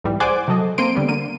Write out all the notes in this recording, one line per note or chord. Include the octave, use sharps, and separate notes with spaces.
B1 G#2 E3 G3
G#4 C5 D5 F#5 G#5 D6
C3 F#3 A4 D#5
A#3 C4 C6 D7 D#7
D3 G3 B3
D3 A#3 D#7